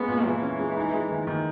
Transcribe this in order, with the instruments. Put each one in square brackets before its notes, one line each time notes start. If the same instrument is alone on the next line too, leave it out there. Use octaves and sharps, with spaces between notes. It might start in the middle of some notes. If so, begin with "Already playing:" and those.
Already playing: [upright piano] G#3 A#3 C#4 [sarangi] B3
[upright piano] A#2
[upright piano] A#2 [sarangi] E3
[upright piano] C#4
G#3
D#4
G#3
D#3
D#3